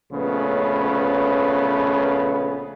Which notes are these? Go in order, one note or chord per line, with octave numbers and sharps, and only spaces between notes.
A#1 C#3 A3 B3 C#4 B4